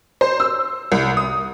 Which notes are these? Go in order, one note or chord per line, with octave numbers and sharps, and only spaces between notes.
C5
E6
C2
D#6